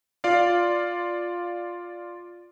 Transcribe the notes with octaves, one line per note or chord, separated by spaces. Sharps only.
F4 D5 F5